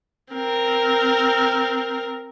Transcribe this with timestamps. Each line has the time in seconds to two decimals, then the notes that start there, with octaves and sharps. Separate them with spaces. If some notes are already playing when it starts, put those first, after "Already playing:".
0.32 C4 A#4